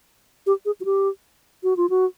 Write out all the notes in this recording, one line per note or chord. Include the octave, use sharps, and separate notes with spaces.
G4
G#4
F#4
G4
F#4
F4
F#4